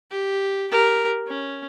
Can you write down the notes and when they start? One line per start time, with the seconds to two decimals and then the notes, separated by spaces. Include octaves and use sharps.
0.11 G4
0.71 G4 A#4
1.27 C#4